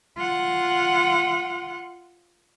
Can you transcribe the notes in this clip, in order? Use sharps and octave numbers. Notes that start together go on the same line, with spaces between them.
F4 F#5